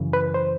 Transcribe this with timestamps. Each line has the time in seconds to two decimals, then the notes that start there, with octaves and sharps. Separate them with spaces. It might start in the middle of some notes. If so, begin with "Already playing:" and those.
Already playing: F#2 C#3 E3
0.13 B4
0.34 C5